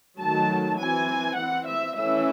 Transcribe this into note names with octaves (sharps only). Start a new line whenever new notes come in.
D#3 F#3 A3 A5
E3 C4 G#5
E3 C4 F#5
E5
E3 A3 C#4 E5